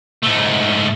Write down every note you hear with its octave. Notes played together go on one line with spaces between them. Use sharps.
G#2 A3